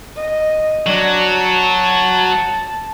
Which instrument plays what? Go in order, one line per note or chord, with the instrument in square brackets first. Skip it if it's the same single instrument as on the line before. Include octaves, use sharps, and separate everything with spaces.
[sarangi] D#5
[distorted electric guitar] F#3 [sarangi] D4
[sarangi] A5